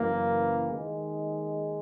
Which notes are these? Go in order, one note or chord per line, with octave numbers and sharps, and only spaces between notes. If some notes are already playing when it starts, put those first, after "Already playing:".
Already playing: F#1 F#2 E3 A#3
D#2 D#3 G#3